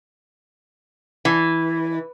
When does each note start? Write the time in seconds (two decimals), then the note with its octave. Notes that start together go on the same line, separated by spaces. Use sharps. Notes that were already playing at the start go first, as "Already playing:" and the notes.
1.25 E3